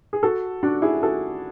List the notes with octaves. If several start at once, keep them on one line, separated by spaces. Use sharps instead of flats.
G#4
F#4 A4
D4 F#4
E4 G#4
F#4 A4